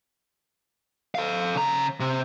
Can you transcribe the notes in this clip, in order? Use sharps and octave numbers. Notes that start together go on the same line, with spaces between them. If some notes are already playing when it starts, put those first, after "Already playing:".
A4 F5
C#3 A#5
C3